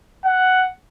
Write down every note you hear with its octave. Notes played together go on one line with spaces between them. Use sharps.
F#5